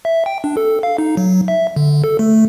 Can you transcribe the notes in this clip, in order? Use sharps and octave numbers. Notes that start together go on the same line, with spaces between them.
E5
G5
D4
A4
F5
D#4
F#3
E5
D3
A4
A3